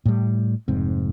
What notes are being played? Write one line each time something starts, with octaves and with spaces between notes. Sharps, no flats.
A2 G3
F1 G#2 C4